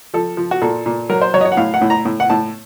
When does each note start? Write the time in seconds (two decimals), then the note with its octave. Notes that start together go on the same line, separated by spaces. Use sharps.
0.14 F3 A4
0.37 F3
0.51 F#4
0.62 A#2 A4
0.86 A#2
1.09 F#3 A#4
1.22 C5
1.34 F#3 C#5
1.41 D#5
1.45 C#5
1.52 F#5
1.57 A2 F5
1.74 F#5
1.81 A2
1.90 A#5
2.05 A2
2.20 F#5
2.30 A2 A5